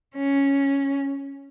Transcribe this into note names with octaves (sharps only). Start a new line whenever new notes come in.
C#4